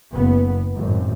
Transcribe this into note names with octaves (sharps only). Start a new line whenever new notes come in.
F#1 B3
G#1 F#2 A2